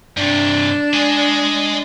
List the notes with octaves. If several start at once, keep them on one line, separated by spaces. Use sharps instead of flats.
G2 C3 D4
G#3 G#4